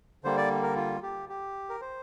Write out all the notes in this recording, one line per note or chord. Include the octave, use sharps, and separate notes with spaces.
D3 G3 A#3 C5
D5
A#4
F4
G4
G4
A#4
C5